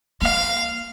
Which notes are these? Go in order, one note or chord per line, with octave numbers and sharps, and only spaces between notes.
A#3 F5